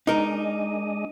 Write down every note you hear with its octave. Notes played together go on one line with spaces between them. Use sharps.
G#3 D4 D#4 A#4 D#5